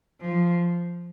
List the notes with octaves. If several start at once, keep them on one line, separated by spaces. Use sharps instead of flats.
F3